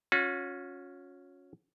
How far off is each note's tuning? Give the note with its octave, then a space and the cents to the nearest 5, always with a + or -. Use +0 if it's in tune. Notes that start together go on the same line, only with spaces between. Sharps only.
C#4 +0 F#4 -45